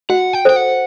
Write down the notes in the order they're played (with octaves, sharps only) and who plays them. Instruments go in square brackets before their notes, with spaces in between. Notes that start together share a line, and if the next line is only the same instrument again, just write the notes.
[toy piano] F#4 [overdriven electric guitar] F#5
[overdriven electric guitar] G5
[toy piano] A4 C5 [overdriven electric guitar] G5
[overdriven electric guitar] F#5